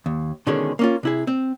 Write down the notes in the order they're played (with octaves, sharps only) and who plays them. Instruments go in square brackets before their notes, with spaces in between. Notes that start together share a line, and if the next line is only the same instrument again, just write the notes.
[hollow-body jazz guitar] D#2
B2 D3 D#3 G#3 C#4 G#4
A#3 C#4 F4
C3 E4 G#4
C4